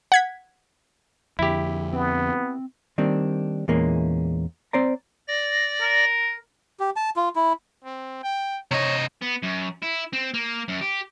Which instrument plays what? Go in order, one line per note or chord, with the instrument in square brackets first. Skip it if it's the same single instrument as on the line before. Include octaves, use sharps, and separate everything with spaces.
[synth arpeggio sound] F#5 G#6 B6
[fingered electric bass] F2 D3 [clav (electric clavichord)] E4 G4
[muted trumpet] B3 [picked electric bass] C4
[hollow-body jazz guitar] D#3 G3 A#3 C4 D4
E2 A#2 E3 G#3 A#3 C#4
C4 C5 D5 A#5
[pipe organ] D5 A#6
[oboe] A#4
[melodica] G4
A5
F4
E4
[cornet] C4
G5
[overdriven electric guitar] C3 D#5 [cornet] C#5
[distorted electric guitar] B3
F#2
E4
C4
A#3
F#2
G4